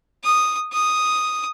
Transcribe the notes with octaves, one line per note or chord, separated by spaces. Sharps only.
D#6
D#6